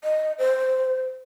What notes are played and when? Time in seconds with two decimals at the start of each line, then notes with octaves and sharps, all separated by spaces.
0.04 D#5
0.38 C5